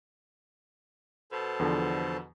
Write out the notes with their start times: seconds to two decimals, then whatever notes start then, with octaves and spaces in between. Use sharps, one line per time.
1.32 B2 A4 C5
1.60 E2 D3 F3